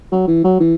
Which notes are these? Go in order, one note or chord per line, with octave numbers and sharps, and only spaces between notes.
F#3
E3
F#3
E3